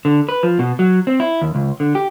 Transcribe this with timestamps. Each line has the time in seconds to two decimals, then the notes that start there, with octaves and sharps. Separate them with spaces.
0.05 D3
0.29 B4
0.43 F3
0.59 B2
0.79 F#3
1.07 C4
1.20 E4
1.42 D#2
1.55 C#2
1.80 D3
1.95 G4